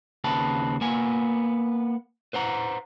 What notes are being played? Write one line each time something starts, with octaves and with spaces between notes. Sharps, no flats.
D#2 C#3 C4 B4 A5
A#3 B3 G#5
B4 C5 F#5 A#5